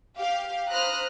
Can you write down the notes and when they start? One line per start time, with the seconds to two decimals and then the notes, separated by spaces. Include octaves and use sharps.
0.17 G4 F5
0.69 C5 A#5 B5 D#6 F6 F#6